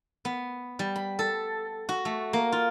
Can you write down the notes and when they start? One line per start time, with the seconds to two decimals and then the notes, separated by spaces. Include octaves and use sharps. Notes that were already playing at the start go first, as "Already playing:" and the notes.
0.25 B3
0.79 G3
0.96 B5
1.19 A4
1.89 F#4
2.05 A3
2.33 A#3
2.52 F4